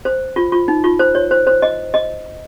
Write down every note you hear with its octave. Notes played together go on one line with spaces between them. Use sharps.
C5
F4
F4
D#4
F4
C5
C#5
C5
C5
D#5
D#5